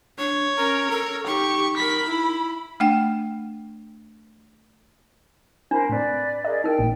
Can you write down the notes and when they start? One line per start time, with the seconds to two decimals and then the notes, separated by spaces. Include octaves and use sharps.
0.18 D4 C#5
0.58 C#4 A#4
0.90 A4 A#4
1.27 D#4 G4 C#6
1.77 A#4 B5 B6
2.08 E4
2.80 A3 D4 F#5 G5
5.71 D4 A#4 C5 B5
5.89 A2 C4 B4 D5
6.45 G#4 A#4 D5 D#5
6.64 D#4 A#4 G5
6.79 A1 A#2